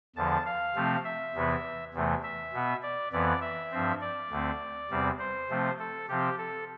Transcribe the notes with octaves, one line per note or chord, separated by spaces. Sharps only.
E2 D3 F3 A5
F5
C3 F3 A3 C4
E5
E2 C3 E3 B3
E2 C3 E3 A3
E5
B2 B3
D5
F2 E3 B3 D5
E5
G2 F3 C4
D5
D2 D3 A3 C4
E2 C3 G3 C4
C5
C3 F3 A3 C4
A4
C3 F3 C4 G4
A4